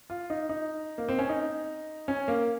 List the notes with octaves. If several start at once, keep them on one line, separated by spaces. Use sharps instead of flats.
F4
D#4
D#4
A#3
C4
C#4
D#4
C#4
A#3